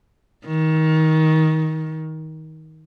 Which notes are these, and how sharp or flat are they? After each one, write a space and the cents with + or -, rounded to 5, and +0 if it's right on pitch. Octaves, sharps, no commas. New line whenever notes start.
D#3 +20